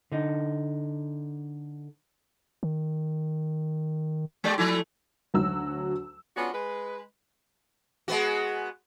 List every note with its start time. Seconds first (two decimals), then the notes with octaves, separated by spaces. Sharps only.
0.12 D3 D#4
2.63 D#3
4.44 G#3 G4 D5
4.58 F3 A3 E4
5.34 D2 F#3 F#4 E6
6.36 G#3 B3 C#4 D4 F4 F#4
6.54 G#3 B4
8.08 G#3 B3 F#4